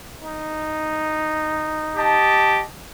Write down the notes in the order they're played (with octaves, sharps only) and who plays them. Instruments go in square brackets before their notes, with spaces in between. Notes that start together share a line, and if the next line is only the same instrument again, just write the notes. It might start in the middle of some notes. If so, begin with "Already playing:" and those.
[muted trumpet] D#4
[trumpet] G4 [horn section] D#5 A5